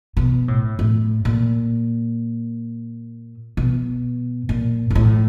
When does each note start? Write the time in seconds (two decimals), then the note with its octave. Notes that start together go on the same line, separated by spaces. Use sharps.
0.17 B2
0.48 A2
0.79 A2
1.25 A#2
3.57 B2
4.49 A#2
4.90 A#2
4.95 A2